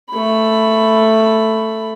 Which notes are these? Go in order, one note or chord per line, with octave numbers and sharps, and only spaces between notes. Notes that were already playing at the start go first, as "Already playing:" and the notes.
A3 B5